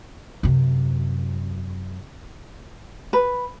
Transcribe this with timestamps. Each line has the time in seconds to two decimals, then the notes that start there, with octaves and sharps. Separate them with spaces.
0.43 F#2 C3
3.13 B4